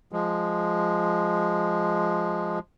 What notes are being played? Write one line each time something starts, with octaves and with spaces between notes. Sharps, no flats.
F3 G#3